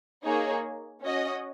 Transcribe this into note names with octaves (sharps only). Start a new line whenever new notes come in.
A#3 D#4 G#4 C#5
C#4 F#4 D#5